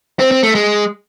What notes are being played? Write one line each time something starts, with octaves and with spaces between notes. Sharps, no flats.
C4
C4
A3
G#3